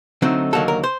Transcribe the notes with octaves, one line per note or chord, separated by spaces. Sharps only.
D3 F#3 A3 C4 D#4
D#2 D3 F#3 A#3 A4
A#4
C5